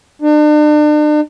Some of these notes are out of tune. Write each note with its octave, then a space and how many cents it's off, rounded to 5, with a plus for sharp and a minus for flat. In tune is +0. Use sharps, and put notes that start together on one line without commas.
D4 +40